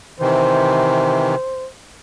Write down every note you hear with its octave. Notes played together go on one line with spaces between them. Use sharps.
C3 D#3 E3 C5